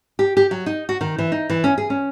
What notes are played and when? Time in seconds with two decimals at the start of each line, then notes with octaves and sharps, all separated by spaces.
0.19 G4
0.37 G4
0.51 F#3
0.66 D#4
0.89 F#4
1.01 D#3
1.18 E3
1.32 D#4
1.50 E3
1.64 C#4
1.78 G#4
1.90 C#4